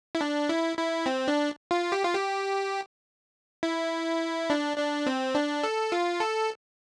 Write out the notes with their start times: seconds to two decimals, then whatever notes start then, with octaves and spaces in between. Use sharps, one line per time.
0.15 E4
0.21 D4
0.49 E4
0.77 E4
1.06 C4
1.28 D4
1.71 F4
1.92 G4
2.04 F4
2.14 G4
3.63 E4
4.50 D4
4.78 D4
5.06 C4
5.35 D4
5.63 A4
5.92 F4
6.20 A4